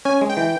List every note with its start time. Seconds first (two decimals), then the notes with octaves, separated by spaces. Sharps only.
0.05 C#4 G#5
0.21 G#3
0.29 G5
0.37 E3